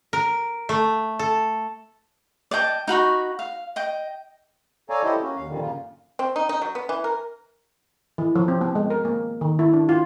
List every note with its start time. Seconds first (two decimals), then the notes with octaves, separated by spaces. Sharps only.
0.13 A#4
0.69 A3
1.19 A4
2.51 D5 D#5 G5 A5
2.88 D#4 F#4 B5 C#6
3.39 F5
3.76 D#5 G5
4.90 A4 C#5 D5 F5 G#5 A#5
5.03 D#4 E4 G4 A4 C5 D#5
5.23 A#3 C#4 F#4
5.36 D#2 F5
5.48 F2 A#2 D3 D#3 G3
5.61 F#2 C#3 A#3 F4
6.19 C4
6.36 D#4
6.49 D#4
6.62 F#3
6.75 B3
6.89 E3
7.04 A#4
8.18 E3
8.35 F3
8.48 C4
8.61 B3
8.75 G#3
8.90 A#4
9.05 A#3
9.41 D#3
9.59 E4
9.73 D4
9.89 F4